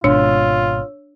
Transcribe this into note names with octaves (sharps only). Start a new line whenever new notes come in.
G#1 B2 D4 F4 C#5 E6